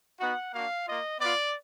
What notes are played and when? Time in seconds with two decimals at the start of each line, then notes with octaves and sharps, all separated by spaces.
0.19 B3 D#4 F#4 F#5
0.54 A#3 D4 F#4 F5
0.86 A#3 F4 D#5
1.20 B3 F4 D5